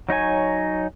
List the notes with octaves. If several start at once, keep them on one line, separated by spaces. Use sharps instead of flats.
F#3 D#4 C#5 G#5